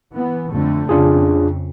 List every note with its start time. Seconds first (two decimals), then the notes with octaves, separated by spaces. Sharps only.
0.14 E3 B3
0.51 F2 D3 A3
0.89 F2 C#3 D4 F4 G#4